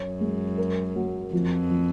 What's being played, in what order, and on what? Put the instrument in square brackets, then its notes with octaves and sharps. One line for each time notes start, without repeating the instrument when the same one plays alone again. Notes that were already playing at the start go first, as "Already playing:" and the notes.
Already playing: [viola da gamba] F#2 [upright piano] C#5
[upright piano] G#3
A#4
F#3
[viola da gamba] F2 [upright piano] F3
[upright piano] F3